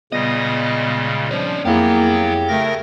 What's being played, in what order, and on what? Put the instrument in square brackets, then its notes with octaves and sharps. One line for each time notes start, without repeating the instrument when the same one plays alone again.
[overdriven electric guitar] C#2 D#5 [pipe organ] A#2 C#3 G3 [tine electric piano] B3 A#6
[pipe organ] F3 [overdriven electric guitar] C#4 D4
[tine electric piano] F2 E4 G#4 [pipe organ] F#3 B3 [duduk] A#3 [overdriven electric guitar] G4
[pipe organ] C#3 A#4 A#6 [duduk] A3